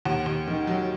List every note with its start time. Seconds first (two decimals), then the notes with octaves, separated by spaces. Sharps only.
0.05 D#2 F#5
0.26 D#2
0.47 D#3
0.67 F#3